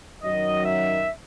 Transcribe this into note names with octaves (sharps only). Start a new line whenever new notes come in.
F#2 D#3 F#3 D#5
E5